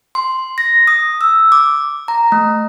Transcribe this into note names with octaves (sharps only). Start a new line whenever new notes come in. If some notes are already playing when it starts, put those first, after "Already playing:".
C6
A#6
D#6
E6
D6
A#5
A3